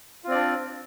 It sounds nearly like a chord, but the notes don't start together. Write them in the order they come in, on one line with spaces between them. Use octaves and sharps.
F4 C4 D5 D4